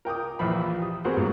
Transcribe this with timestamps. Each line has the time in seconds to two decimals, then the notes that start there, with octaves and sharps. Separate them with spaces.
0.05 A#4 G5 D6 D#6
0.39 A#1 E3 F3 B5
0.78 G4 D#6
1.05 B3 C4 F#4 G#4 A#4 C5
1.17 G#2 C#3 F#3 A#3